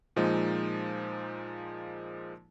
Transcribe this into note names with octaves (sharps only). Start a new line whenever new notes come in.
A#2 F3 G#3 D#4